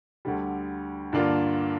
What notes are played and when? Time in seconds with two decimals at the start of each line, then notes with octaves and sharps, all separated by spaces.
0.25 D2 D3 G3
1.13 G2 D3 A#3 D4 F4